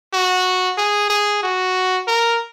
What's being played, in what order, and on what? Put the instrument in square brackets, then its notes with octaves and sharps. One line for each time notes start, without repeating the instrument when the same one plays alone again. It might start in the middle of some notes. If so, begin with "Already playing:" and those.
[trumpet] F#4
G#4
G#4
F#4
A#4